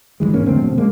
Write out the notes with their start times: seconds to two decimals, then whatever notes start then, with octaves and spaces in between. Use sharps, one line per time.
0.20 G1 D#2 E3 G#3
0.33 E1 G#2 A#3 C#4
0.46 F2 D3 A3 C4
0.62 B2
0.78 G#3 A#3